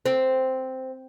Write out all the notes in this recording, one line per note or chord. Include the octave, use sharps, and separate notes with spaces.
C4